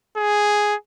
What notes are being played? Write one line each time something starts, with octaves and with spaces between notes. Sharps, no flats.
G#4